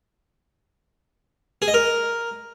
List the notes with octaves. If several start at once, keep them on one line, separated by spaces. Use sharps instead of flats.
G#4
D#5
A#4